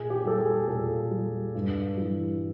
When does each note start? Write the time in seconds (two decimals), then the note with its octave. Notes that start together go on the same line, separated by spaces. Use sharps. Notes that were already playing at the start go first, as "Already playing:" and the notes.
Already playing: A#2 G#4
0.10 G4
0.25 G3 A4
0.40 G#4
0.67 A#2 A4
1.11 G3
1.55 G2
1.97 E3 G3